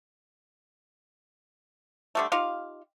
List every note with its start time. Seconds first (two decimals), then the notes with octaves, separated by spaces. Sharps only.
2.15 D3 G3 A3
2.32 D#4 F4 G4 F5